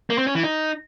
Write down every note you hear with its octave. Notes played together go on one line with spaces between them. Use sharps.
A#3
C4
C#4
E3
D#4